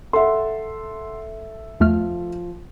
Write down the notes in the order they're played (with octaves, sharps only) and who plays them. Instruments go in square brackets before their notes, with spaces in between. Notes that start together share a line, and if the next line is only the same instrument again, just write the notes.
[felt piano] A4 E5 [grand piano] F#5 C6
[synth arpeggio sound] E2 A3 F6 [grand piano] F3